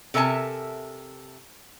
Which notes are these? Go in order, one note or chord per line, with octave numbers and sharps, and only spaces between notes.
C3 A4 A#4 E5 G#5 A5